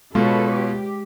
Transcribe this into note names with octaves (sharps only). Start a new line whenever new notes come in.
B2 G#3 F4 A4 B4 C#5
G4